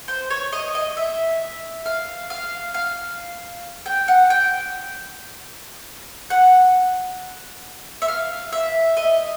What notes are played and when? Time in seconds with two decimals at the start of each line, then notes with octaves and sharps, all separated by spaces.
0.08 C5
0.30 C#5
0.53 D#5
0.75 D#5
0.97 E5
1.86 F5
2.30 F5
2.74 F5
3.86 G5
4.08 F#5
4.30 G5
6.30 F#5
8.02 E5
8.08 F5
8.53 E5
8.97 D#5